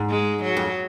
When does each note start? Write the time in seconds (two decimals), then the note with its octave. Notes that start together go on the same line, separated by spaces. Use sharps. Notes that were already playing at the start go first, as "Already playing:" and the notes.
Already playing: G#2
0.09 G#3
0.43 F#3
0.57 F2